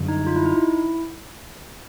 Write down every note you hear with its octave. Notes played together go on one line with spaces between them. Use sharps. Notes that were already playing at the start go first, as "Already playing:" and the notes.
Already playing: F#2 D3 G3
D#4
F4
E4
D#4
E4